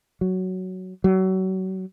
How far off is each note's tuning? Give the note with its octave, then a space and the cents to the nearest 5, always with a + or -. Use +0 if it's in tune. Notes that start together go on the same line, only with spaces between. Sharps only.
F#3 +5
F#3 +30